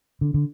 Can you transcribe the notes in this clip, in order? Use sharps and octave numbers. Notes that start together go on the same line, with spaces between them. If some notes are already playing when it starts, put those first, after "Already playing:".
D3
D3